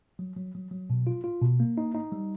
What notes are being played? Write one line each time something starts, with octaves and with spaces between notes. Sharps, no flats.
F#3
F#3
F#3
F#3
B2
F4
F4
B2
A#3
D#4
D#4
G3